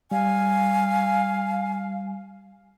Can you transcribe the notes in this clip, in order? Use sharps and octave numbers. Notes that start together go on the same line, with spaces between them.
G3 F5 G#5